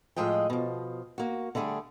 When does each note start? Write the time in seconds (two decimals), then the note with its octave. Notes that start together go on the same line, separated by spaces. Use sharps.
0.16 A2 F3 G#3 D#5 G5
0.50 B2 F3
1.18 A#3 F#4
1.55 D3 G3 A3 G#4